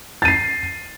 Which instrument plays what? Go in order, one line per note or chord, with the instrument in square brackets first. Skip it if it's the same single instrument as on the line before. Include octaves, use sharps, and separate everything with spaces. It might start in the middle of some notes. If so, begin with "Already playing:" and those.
[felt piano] A6
D#7
C7